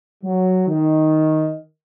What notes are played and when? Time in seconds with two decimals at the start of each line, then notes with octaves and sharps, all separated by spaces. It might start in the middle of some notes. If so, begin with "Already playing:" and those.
0.24 F#3
0.68 D#3